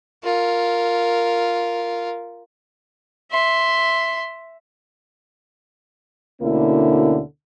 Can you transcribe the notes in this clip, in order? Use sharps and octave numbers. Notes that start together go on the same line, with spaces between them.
F4 A#4
E5 C6
D2 B2 D3 A#3 C#4 E4